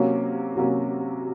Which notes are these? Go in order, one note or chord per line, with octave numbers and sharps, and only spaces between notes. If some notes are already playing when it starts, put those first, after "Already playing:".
Already playing: C3 F#3 A#3 C#4
C3 F#3 A#3 C#4